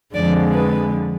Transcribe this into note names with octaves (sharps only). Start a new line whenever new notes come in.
F2 D3 F3 G#3 D5
B4